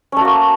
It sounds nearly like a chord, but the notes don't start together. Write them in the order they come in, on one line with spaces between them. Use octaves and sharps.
C#4 A3 F#4 A#3